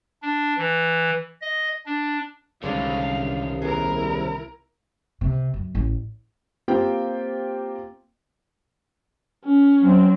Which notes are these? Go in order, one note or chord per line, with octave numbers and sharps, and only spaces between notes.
D4
E3
D#5
D4
C2 D3 D#3 G#3 C#4 D4 F5
D#2 B3 E4 G#4 A#4
C3
F#2
A1
A#3 C4 F4 G4 C5 G5
C#4
F#3 C4